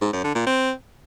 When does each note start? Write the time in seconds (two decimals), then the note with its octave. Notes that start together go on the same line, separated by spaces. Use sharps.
0.01 G#2
0.13 F#2
0.24 D3
0.35 A#2
0.46 C4